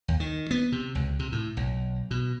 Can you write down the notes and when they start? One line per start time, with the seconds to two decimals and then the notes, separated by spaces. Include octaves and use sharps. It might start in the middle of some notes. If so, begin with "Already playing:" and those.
0.08 D#2
0.20 D#3
0.51 B3
0.72 C3
0.95 C#2
1.19 C3
1.32 A2
1.57 B1
2.11 B2